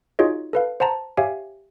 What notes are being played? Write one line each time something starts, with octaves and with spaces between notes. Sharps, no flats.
D#4 F4 F#4 G#4 C#5 D#5
A4 B4 F5
C5 F#5 A5 A#5
G4 C#5 E5 F5 G5 G#5